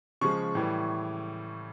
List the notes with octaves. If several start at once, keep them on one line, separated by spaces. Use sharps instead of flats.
C#3 F3 G#3 C#6
A2 E3 G3